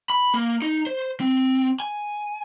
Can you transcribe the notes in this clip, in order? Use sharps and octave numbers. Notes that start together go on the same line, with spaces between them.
B5
A#3
D#4
C5
C4
G#5